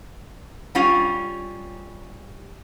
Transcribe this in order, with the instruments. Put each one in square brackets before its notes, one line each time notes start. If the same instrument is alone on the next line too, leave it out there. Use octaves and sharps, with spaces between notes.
[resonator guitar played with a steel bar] G3 C#4 F4